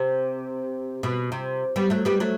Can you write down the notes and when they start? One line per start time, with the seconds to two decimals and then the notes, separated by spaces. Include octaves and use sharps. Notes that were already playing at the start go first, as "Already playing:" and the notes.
Already playing: C3
1.03 B2
1.32 C3
1.76 G3 B3
1.90 F#3 A3
2.05 G3 B3
2.20 F#3 A3